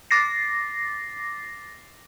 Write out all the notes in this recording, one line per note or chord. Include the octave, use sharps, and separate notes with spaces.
D6 A6 A#6 C7